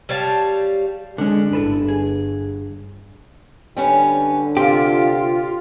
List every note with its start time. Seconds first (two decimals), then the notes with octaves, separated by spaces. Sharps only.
0.09 G3 C#5 F5 A5
1.18 D3 G#3 C#4 D4
1.53 G1 G2 E4 A4 B4
1.88 G#4
3.77 D3 G3 C#4 B4
4.57 C3 F4 G4